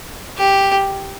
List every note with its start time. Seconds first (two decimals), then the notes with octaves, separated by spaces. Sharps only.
0.38 G4